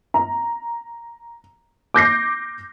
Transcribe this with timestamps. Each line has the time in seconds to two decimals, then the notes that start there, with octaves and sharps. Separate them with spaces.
0.14 A#5
1.94 D6 G6 A#6 C7